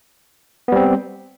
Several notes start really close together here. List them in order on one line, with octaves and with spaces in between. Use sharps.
B3 G3 C4